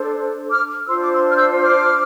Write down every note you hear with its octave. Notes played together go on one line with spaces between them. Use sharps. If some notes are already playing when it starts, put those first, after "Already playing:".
Already playing: D4 A4 C5
D6 F6
D4 F4 C5 C6 E6
D6
C6 E6
F6
E6 G6
D6 F6